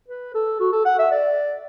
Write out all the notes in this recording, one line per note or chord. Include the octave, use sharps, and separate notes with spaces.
B4
A4
F#4
A4
F#5
E5
D5